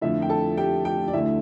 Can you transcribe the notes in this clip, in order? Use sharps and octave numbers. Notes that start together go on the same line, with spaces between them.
F2 D3 F3 A3 E4 E5
G5
A4 A5
G4 G5
G4 G5
D5
D2 D3 A3 E4 E5